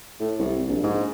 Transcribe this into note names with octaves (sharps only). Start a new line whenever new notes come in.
A2
C2
A#1
G#2